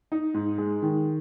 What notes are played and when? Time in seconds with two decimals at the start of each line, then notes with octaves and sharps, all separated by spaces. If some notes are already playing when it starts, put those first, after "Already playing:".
0.12 D#4
0.34 G#2
0.58 G#3
0.82 D#3